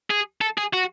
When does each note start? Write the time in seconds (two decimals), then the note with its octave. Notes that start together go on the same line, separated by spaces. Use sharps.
0.10 G#4
0.41 A4
0.58 G#4
0.74 F#4